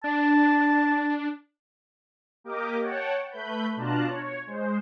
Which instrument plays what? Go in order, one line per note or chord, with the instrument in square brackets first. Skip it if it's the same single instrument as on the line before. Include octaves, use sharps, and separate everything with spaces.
[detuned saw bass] D4 [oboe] A5
[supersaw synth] A#3 G4 A#4 D#5 D6
C#5 F#5 G5 A5
A3 B4 B5 G6
B2 D4 F4 A5 A#5 F#6
C#5
G#3 C5